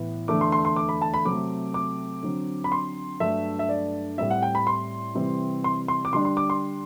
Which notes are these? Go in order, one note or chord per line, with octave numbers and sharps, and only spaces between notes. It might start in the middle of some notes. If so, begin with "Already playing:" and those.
Already playing: A2 E3 B3
E2 D3 A3 D4 D6
C6
C6
C6
D6
B5
A5
B5
C3 F#3 A3 C4 D6
D6
D3 F#3 C4
B5
C6
G2 F#3 A3 D4 E5
E5
D5
A2 G3 C4 E5
F#5
G5
B5
C6
C3 E3 G3 C4
C6
C6
D6
D3 G3 D4 C6
C6
D6
C6